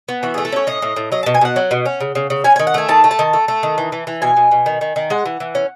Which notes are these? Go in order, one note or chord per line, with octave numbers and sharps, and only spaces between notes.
B3
E3 F#4
A3 G#4
A4
C#4 C#5
A2 D#5
A2
A2
F#3 D#5
B2 A5
G#5
B2 F#5
F#3
B2
C#4
C#3
C#3
C#3
C#4 G#5
D#3 G#5
F#5
A3 G#5
D#3 A5
A3
A5
D#3
A3
A3
D#3
E3
E3
E3
B2 G#5
B2
B2
D#3
D#3
D#3
G#3 F#5
E3
E3
C#4